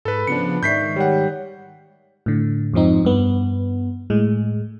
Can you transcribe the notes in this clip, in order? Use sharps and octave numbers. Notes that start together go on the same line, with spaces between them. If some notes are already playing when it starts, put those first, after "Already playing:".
G#2 A4 B4 B5
C#3 F3 B3 D4 C#7
G#2 D#3 D5 E5 C#6 G6 B6 C7
G3 G4 C#5 F#5 G5
A2 D3
F2 G#2 F3 C4 D#4
G2 B3
A2 G#3